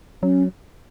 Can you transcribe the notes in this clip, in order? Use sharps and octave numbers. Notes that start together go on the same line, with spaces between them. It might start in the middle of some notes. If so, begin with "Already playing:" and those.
F#3 C#4